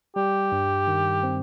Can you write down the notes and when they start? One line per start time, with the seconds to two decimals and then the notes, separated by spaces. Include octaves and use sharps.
0.16 G3 G4
0.52 G2
0.87 D#3
1.23 C4